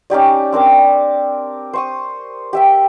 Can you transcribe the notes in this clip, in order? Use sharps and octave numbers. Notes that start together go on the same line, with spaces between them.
C#4 D#4 G4 D5
C4 D4 A#4 D6
C5 C#6 D#6
G4 E5 G5